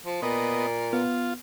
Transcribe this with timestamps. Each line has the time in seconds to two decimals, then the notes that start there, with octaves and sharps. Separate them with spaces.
0.06 F3
0.23 A#2 B3 D#5
0.93 B3 F4